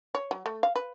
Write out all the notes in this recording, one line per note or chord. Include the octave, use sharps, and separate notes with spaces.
C#5
F#3
A3
F5
B4